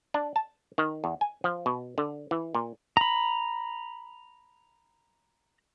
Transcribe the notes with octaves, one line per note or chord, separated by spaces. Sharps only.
D4
A5
D#3
E2
G#5
F3
B2
D3
E3
A#2
A#5 B5